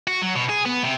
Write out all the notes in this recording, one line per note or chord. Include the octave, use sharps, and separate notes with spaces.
F#4
F#3
B2
G#4
B3
C3